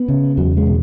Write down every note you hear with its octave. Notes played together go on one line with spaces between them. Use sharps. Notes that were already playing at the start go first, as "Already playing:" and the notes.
Already playing: B3
C#3
E2 F#3
G#3
B2